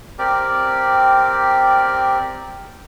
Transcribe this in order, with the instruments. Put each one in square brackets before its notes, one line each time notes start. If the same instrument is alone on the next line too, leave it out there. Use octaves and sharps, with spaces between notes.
[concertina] C4 G4 A#4 D5